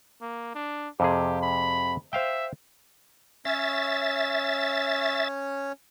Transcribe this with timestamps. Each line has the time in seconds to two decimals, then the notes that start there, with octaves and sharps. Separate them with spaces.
0.21 A#3
0.55 D4
1.00 F2 C3 G4 G#4
1.42 B5
2.13 C5 E5 F5 G5
3.45 C#4 C#5 E5 A6